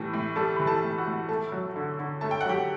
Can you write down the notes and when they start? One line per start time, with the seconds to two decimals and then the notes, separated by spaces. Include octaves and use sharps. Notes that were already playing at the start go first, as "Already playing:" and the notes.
Already playing: A2 E3 G3 A5
0.13 A2
0.36 G3 A4 A5
0.56 E3 B5
0.67 A4 A5
0.83 A2
0.98 F#4 F#5
1.06 A2
1.29 A3 A4 A5
1.52 F#3
1.76 D3
1.99 D3
2.21 A3 A5
2.31 G5
2.41 F#5
2.45 F#3 G4 G5